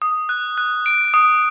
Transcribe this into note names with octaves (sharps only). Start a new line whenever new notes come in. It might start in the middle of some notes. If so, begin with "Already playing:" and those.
D#6
F#6
F#6
D7
D#6